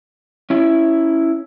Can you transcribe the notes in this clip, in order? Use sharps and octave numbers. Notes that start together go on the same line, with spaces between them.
C#4 E4